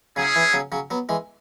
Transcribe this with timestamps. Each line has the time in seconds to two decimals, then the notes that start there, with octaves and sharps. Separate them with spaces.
0.16 C#3 F#3 C#4 E4 G#4
0.36 E3
0.53 C#3 F#3
0.72 C#3 F#3
0.90 F#3 B3
1.09 E3 G#3